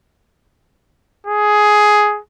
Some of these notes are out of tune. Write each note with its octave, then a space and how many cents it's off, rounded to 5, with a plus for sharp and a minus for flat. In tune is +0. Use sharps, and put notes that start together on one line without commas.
G#4 +10